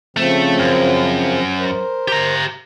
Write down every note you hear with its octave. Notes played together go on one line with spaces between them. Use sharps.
C#3 F3 A3 C4
F#2
A#4 C5
G4 A#5